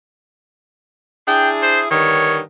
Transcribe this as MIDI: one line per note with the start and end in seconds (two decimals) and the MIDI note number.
1.27 1.87 62
1.27 1.87 64
1.27 1.87 68
1.27 1.50 79
1.62 1.80 72
1.91 2.40 43
1.91 2.40 50
1.91 2.40 51
1.91 2.37 73